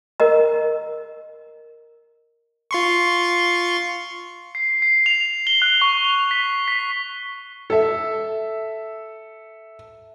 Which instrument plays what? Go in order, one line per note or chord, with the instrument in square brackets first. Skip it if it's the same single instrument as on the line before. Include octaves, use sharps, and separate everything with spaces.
[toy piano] A#4 D#5 A#5
[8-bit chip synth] F4 C6 C#6
[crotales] C7
C7
F7
G7
F#6
C#6
F7
B6
B6
[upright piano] A4 E5